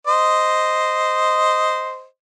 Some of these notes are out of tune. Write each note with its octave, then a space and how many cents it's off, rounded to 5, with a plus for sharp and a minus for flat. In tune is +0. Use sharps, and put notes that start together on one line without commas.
C5 -10 D#5 +0